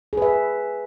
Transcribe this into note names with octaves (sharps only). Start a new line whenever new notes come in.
G#4 B4 E5